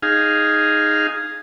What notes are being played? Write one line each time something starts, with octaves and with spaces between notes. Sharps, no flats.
D#4 G#4 F5